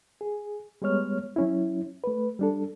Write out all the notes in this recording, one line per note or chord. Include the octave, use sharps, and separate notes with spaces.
G#4
G3 G#3 B3 C#5 F6
F#3 C#4 E4
A3 B4
G3 D4 A4